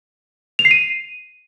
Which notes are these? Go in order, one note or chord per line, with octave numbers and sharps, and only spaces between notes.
F7
C7
D#7